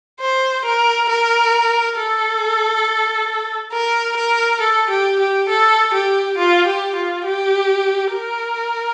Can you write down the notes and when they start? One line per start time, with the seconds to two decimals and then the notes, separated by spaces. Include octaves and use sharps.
0.21 C5
0.65 A#4
1.09 A#4
1.97 A4
3.73 A#4
4.16 A#4
4.61 A4
4.90 G4
5.20 G4
5.49 A4
5.94 G4
6.38 F4
6.66 G4
6.95 F4
7.25 G4
8.12 A#4